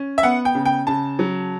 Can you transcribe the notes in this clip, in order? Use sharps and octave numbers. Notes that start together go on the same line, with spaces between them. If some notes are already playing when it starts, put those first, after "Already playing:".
Already playing: C#4
E5
B3 F#5
G5
C#3
G5
C#3 A5
F#3